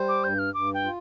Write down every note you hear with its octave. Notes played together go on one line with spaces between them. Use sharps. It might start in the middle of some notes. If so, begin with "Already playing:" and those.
Already playing: G3 C5
D6
G2 G6
F6
G2 D6
G5
F4